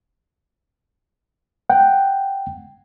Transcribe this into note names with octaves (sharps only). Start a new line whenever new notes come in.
F#5 G5